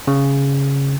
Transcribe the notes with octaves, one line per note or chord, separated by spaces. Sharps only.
C#3